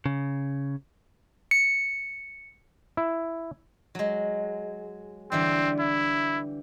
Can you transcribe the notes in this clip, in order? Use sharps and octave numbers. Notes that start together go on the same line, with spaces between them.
C#3
C#7
E4
F#3 G#3
D3 E3 G3 C4
E4